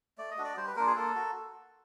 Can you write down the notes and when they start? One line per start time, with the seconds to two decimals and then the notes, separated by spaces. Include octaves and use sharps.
0.18 A3 D5
0.31 D#5
0.38 D4 F#4
0.44 D5
0.57 G3 C5
0.67 B4
0.76 A#3 D4 F4 A#4
0.86 G#4
0.96 A#3 A4
1.16 F#4